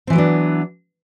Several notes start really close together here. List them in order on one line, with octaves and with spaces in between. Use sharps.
C4 E3 F#3 B3 D4